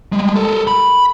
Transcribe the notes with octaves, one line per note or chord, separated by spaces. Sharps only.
G3 G#3
A4 A#4
B5